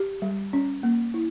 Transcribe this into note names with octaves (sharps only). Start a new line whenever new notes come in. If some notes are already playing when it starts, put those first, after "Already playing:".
Already playing: G4
G3
C#4
A#3
E4